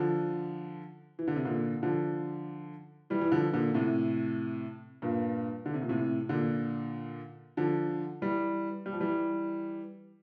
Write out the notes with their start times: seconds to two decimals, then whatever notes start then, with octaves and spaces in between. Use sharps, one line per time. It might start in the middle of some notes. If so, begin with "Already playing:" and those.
Already playing: D3 F3
1.19 E3
1.28 D3
1.36 C3
1.45 A#2 D3
1.83 D3 F3
3.10 E3 G3
3.21 E3
3.32 D3 F3
3.54 A#2 D3
3.74 A2 C3
5.02 G2 A#2
5.66 D3
5.74 C3
5.82 A#2
5.89 A2 C3
6.29 A#2 D3
7.57 D3 F3
8.22 E3 G3
8.86 G3
8.93 F3
9.00 E3 G3